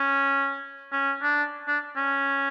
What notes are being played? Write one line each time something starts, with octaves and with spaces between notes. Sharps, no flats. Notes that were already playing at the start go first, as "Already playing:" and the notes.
Already playing: C#4
C#4
D4
D4
C#4